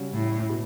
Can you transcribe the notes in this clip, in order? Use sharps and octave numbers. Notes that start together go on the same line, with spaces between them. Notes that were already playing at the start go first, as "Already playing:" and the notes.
Already playing: C#3 G3 C#4 F#4
A2
B2